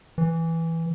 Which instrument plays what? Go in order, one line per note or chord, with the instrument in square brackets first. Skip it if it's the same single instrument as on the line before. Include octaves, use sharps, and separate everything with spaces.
[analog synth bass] E3